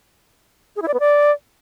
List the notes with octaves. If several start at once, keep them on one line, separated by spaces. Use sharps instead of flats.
G#4
E4
D5
B3
D5